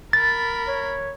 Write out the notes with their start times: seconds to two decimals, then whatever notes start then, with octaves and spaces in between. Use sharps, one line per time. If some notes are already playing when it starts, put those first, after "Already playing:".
0.13 A#4 B5 A6
0.68 C#5